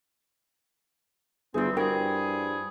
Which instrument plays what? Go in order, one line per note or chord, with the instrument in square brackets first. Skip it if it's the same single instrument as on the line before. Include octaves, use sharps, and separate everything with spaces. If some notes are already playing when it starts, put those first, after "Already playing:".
[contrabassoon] G1 [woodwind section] E3 G3 C4 [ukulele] F4 G#4
[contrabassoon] G2 [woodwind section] F3 E4 G#4 [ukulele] F#4 A#4 G5